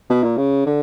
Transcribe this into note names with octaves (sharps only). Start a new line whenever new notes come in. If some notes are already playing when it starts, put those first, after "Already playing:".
B2
A#2
C#3
D3